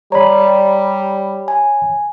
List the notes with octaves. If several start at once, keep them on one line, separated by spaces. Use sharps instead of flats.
G3 C#5 D5 A#5 B5
G#5